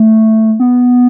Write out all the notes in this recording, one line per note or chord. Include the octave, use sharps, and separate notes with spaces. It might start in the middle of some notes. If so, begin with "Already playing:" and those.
Already playing: A3
B3